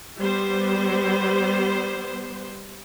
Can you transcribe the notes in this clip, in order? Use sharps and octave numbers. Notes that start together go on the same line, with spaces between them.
G3 B3 C5